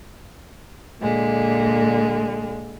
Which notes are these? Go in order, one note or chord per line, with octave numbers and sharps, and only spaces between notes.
A#2 D3 G#3